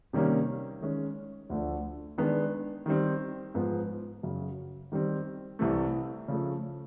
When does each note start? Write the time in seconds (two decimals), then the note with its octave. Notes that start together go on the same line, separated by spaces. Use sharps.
0.13 C3 D#3 G3 A#3 C#4
0.81 D#3 G#3 C#4
1.50 D2 D3 F3 A3
2.18 D#3 G#3 B3 D4
2.86 D#3 G3 C4
3.54 G#2 F3 G#3 B3
4.23 F#2 C#3 F#3
4.92 D#3 G3 C4
5.59 C2 C3 E3 A3
6.28 C#3 F3 A3